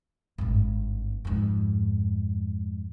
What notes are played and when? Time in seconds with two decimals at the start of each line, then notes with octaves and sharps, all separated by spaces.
0.38 G#1 G2
1.25 F2 G#2